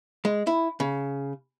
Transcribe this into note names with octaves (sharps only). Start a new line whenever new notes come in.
G#3
E4
C#3